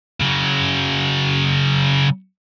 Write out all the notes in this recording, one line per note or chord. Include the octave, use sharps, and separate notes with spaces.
C#3 F#3